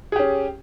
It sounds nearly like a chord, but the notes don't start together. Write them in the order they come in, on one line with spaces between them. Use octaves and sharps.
G#4 G4 C#4